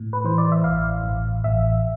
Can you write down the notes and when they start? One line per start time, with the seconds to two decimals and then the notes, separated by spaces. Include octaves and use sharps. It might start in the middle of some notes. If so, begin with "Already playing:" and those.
Already playing: A2
0.13 B4
0.24 E3 C5
0.38 D5
0.52 E5
0.64 A1 F5
1.04 A1
1.44 A1 E5